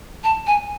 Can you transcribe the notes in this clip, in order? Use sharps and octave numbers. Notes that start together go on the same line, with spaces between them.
A5
G#5